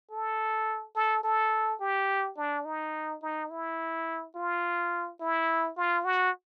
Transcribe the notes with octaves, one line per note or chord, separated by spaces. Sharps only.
A4
A4
A4
G4
D4
D#4
D#4
E4
F4
E4
F4
F#4